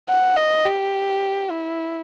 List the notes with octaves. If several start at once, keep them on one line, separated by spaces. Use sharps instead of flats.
F#5
D#5
G4
E4